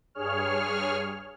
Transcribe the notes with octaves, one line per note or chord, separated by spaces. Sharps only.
G2 G#4 C#5 F6